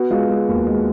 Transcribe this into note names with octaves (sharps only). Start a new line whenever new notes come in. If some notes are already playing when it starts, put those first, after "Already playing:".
Already playing: B3 F#4
G#3 F4
G#3
D#2
G#3